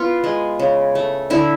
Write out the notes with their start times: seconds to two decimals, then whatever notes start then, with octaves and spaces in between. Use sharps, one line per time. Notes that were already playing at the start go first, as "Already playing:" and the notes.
Already playing: B3 F4
0.24 G#3
0.59 C#3
0.95 A3
1.30 D3 E4